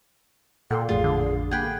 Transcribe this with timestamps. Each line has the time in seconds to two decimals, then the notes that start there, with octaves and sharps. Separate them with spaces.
0.71 A#2 A4 F#5 G5 C6
0.89 A1 F2 A2 F4 G#4
1.04 D3
1.51 A#3 G#4 F#5 G5 B5 F#6